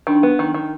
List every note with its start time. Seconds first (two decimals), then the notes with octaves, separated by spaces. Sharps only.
0.07 D#3 D4
0.23 B3
0.39 D#3
0.54 D#3